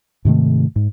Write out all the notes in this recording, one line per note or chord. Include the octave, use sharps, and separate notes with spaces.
G#2 C3 D#3 A3
G#2